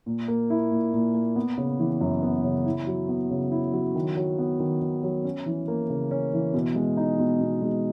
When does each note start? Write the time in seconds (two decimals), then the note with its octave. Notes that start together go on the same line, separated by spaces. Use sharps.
0.06 A#2
0.28 A#3
0.50 E4
0.71 A#2
0.93 A#2
1.14 A#3
1.36 B3
1.58 C#3
1.79 E3
2.01 F#2
2.23 B3
2.44 C#3
2.66 E4
2.87 F#3
3.09 B3
3.31 C#3
3.52 E4
3.73 F#3
3.95 D#3
4.17 F#3
4.39 B3
4.60 D#3
4.81 D#3
5.03 F#3
5.24 C#4
5.46 E3
5.68 A#3
5.90 C#3
6.11 C#4
6.33 E3
6.54 B2
6.76 G#3
6.97 D#4
7.19 B2
7.41 B2
7.62 G#3